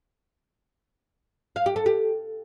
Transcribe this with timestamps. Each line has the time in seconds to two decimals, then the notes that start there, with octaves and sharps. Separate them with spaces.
1.56 F5
1.66 G4
1.76 A4
1.86 G4